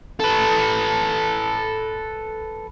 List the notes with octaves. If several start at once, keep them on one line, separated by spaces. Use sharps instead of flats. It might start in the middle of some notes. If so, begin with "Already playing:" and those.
A4 B4